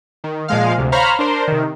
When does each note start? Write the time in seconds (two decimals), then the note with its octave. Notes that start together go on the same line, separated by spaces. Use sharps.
0.24 D#3
0.48 A#2 F3 G#3 F5
0.78 D2 C3
0.92 C5 C#5 F5 A#5 B5 F6
1.19 D4 A#4 C5
1.48 C3 D#3